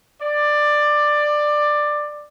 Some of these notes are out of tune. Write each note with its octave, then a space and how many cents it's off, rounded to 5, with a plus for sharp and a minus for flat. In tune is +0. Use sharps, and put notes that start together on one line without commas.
D5 +15